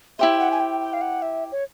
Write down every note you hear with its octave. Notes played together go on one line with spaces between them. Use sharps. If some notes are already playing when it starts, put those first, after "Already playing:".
E4 G4 C5 E5
F#5
G#5
G5
G5
F5
F#5
E5
C#5